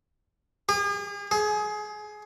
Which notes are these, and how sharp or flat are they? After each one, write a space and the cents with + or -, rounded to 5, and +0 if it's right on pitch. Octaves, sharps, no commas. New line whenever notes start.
G#4 -45
G#4 +20